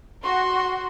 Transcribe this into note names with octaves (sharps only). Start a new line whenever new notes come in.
F#4 C6